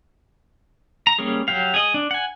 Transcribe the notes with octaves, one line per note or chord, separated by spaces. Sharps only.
A#5
G3 A#3 C#4 G#4
F#3 G4 F5
G#4 D#5
D4
F#5 G#5